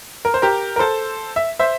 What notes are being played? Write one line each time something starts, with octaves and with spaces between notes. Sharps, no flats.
A#4
C5
G4 A#4
A#4
A4 C5
E5
C5 E5